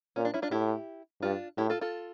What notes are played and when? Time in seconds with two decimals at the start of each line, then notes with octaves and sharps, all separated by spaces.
0.16 A#2 C#4
0.25 D4
0.34 C#4 E4
0.42 D4 F4
0.51 A2 E4 G4
1.22 G2 D4 F4
1.57 A2 E4 G4
1.70 F4 A4
1.81 F4 A4